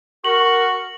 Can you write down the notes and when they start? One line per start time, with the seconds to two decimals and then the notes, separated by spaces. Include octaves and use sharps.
0.24 F#4 A#4 C#6 F#7